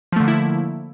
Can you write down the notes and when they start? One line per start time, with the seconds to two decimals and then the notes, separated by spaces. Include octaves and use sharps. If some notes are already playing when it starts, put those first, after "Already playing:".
0.12 F3
0.16 A3
0.20 D3
0.24 A#3
0.28 E4